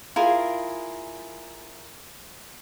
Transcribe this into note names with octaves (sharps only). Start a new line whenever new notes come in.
E4 F4 G#4 A#4